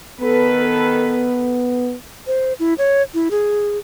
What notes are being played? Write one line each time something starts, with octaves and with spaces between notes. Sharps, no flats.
D#3 B3 A4 B4
C5
E4
C#5
E4
G#4